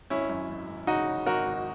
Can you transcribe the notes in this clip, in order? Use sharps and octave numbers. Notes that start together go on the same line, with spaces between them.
G#1 C#4 E4
F#2
G#1
G#1
C#3 D#4 F#4
C#3
G#1 F#4 A#4
G#1